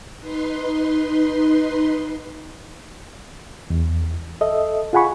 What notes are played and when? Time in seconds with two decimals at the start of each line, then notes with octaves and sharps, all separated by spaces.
0.21 D#4 B4 C6
3.70 E2
4.41 A4 D#5 E5
4.93 F4 G#4 F#5 G#5 B5 C#6